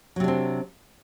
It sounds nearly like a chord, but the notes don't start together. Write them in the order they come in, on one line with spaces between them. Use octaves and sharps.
F#3 C3 D4 C4